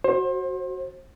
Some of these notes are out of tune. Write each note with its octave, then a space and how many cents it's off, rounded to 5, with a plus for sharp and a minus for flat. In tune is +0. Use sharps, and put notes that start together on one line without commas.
F#4 +0 C5 +30